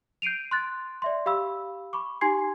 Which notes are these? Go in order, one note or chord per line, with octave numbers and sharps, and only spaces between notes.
G6 C7 D7 D#7 F7
C6 F#6 A6
D5 E5 C6
G4 F5 B5 E6
B5 C#6 D6
D#4 G4 G#5 C6 G#6 C7